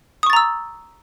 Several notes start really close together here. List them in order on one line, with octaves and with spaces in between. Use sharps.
D#6 C#6 A6 A#5 E6